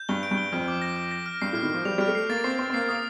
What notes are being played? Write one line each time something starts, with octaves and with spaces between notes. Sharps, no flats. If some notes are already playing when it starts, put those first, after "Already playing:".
Already playing: G6
G2 G7
D7
G2
G7
F2 F6
D6
A#6
D6
A#6
F6
G2 C7
A2 F6
D#3
F3 F6
G3 F7
G3 F6
A3
C7
A#3 A6
C4 C7
C4 C7
C4
A#3 C7
A#3 D#6